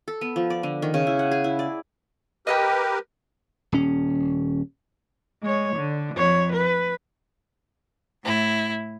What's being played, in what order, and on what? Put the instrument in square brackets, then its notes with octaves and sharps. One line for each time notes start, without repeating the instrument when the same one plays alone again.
[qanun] A4
B3
F3
D5
D3
D#3
C#3
E4
F#5
G#4
E4
D5
[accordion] G4 A#4 B4 [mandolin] D#5 F5 G5
[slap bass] D#1 C#4
[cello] G#3 C#5
D3
F2 C#5
B4
[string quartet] A2 E4